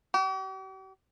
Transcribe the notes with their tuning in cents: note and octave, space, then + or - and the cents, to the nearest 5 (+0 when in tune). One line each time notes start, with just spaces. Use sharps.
G4 -45